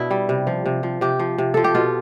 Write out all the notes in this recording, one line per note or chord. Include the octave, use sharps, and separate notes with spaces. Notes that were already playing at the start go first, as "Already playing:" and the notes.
Already playing: B2 D4 E4
G3
C3
F3
C3
F3
C3 G4
F3
C3
F3 A4
G4
B2 F4